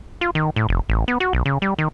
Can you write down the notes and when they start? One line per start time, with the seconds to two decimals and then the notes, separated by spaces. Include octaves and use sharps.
0.21 F4
0.35 D#3
0.56 A2
0.69 F1
0.89 A1
1.08 B3
1.20 F#4
1.33 B1
1.46 C#3
1.62 G3
1.78 D#3